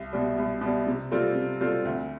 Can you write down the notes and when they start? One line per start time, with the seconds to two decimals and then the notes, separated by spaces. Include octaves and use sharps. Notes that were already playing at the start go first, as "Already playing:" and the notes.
Already playing: C2
0.13 B2 G3
0.38 C2
0.61 B2 G3
0.87 C3
1.11 G3 C4 F4 A4
1.35 C3
1.61 G3 C4 F4 A4
1.85 D2